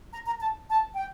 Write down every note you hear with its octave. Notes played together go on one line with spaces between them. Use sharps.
A#5
A#5
A5
A5
G5